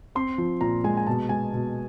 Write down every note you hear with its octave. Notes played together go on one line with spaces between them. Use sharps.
C4 C6
F3
A#2 A#5
G#3 G#5
G#5
B2 A5
G#3 G#5
B2